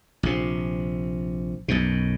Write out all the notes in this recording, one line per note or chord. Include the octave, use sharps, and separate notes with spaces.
A#1 C3
B1 F#2 B2